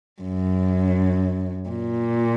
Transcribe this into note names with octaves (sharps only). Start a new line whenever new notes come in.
F#2
A#2